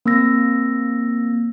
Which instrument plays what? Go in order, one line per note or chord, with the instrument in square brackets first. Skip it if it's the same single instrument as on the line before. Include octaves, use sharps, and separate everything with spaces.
[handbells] A#3 C4 E6 A#6